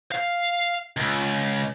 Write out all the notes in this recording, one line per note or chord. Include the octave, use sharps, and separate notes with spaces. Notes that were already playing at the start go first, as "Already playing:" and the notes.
F5
C#2